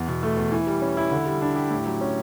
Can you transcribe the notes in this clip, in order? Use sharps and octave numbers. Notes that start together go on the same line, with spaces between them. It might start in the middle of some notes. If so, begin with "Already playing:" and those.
Already playing: E2
B2
A3
E2
E3
G3
C#4
E4
D3
G3
D4
G4
A2
F#3
C#4